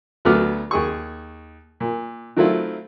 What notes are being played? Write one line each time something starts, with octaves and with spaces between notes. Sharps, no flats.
D2 F#3 A3 B3 D6 F6
D#2 G#4 C#6
A#2
D#3 F#3 A3 C4 E4 F4